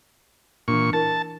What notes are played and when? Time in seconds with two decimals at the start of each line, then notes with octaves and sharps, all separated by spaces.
0.68 A#2 E3 D4 C#6
0.93 E4 A#4 A5 A6